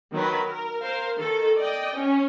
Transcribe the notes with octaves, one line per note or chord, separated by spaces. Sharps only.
D#3 F#3 A#4 B4 B5
A#4
A#4 C5 F5
D#3 A4
D5 D#5 G5
C#4